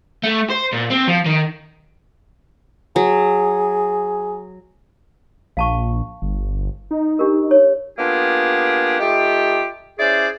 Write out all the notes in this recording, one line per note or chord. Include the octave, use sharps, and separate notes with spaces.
A3
C5
A#2
C4
F3
D#3
F#3 G#4
A#1 F5 A5 C#6
G1
D#4
D4 G4 A#4
C#5
A#3 B3 D4 F4 G4 G#4
A3 D#4 F4 G4
C#4 E4 G#4 C5 D5